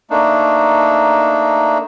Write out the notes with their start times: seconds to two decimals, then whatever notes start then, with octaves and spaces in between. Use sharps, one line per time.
0.10 A3 A#3 D4 D#4